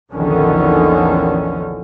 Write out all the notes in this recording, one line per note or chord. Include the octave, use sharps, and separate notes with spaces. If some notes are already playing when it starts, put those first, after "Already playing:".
A#1 E2 D3 D#3 C#4